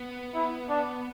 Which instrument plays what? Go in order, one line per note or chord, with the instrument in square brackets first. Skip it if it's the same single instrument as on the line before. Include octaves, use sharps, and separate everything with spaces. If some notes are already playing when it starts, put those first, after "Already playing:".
Already playing: [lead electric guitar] B3
[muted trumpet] E4
D4